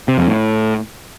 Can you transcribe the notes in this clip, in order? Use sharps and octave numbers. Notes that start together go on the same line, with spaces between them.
C3
F2
A2